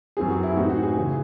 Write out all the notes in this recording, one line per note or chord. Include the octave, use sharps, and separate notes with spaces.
F#2 E3 C4 G#4
F#4
E4
A2 E3 C4 D#4 F#4
F#4
G#4
C#3 E3